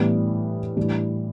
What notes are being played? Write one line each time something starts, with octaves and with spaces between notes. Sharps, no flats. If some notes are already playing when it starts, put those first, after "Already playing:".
Already playing: A2 E3 G3 B3 D4
A2 E3 G3 D4